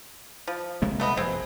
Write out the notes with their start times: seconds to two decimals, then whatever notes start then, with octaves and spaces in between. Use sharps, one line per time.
0.47 F3
0.82 C3 G#3 A#3
1.00 A3 B3 D#5
1.17 F1 A#1 F#2 C4 G#4